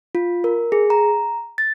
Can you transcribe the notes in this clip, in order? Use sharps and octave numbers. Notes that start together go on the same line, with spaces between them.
F4
A#4
G#4
A#5
A6